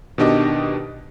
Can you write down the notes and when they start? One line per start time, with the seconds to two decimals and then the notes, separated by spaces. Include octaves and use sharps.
0.18 B2 D#3 D4 G4 D#5 D6